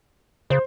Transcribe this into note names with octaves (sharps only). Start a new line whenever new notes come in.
C#3 C5